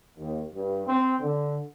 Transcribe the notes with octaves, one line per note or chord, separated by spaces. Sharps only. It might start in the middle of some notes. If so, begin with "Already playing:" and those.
D#2
G2
C4
D3